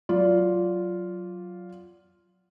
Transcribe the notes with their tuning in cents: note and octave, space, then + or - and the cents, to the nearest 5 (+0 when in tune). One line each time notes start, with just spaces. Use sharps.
F#3 +0 F4 +0 D5 -20